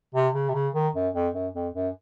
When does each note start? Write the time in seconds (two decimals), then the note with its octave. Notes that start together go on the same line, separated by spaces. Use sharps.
0.14 C3
0.34 C#3
0.49 C3
0.54 C#3
0.74 D#3
0.94 F#2
1.14 F2
1.34 F#2
1.54 F2
1.75 F#2